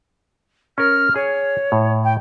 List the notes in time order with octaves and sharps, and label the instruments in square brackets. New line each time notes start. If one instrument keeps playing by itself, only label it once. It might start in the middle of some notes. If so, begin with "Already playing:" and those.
[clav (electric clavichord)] C#4 A#4 [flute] F6
[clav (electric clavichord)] G#4 [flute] C#5
[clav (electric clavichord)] A2
[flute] G5